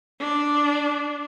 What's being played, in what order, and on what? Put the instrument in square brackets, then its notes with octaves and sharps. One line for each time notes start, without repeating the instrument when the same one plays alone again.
[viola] D4